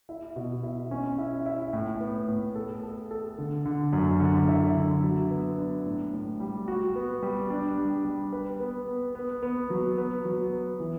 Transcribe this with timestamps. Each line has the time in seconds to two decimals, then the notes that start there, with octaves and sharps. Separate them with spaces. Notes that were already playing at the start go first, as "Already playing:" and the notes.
0.09 E4
0.36 B2
0.63 E4
0.91 C#4
1.18 E4
1.46 E4
1.73 A2
2.00 B3
2.28 A2
2.56 A4
2.83 A4
3.11 A4
3.38 D3
3.66 D3
3.93 F#2
4.20 D3
4.48 E4
4.76 D3
5.03 F#3
5.31 B3
5.58 D4
5.86 A2
6.13 A2
6.40 G3
6.68 F#4
6.96 B3
7.23 G3
7.50 D4
7.78 G3
8.05 G3
8.33 B4
8.60 B3
8.88 B3
9.15 B3
9.43 B3
9.70 F#3
9.98 B3
10.25 F#3
10.52 B3
10.80 E3